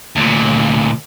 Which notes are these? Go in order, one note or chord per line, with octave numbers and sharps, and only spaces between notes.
D2 A#2